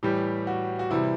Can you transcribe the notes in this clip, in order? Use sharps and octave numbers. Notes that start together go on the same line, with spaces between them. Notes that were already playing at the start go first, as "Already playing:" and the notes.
A2 E3 G3 G4
F#4
F#4
C3 E3 G3 E4